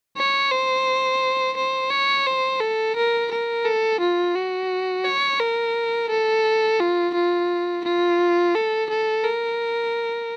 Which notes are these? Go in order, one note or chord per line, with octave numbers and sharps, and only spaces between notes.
C#5
C5
C5
C#5
C5
A4
A#4
A#4
A4
F4
F#4
C#5
A#4
A4
F4
F4
F4
A4
A4
A#4